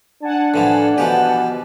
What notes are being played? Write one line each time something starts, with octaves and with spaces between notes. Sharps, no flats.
D4 F#5 G#5 A5
A2 E3 F3
B2 E3 F3 G4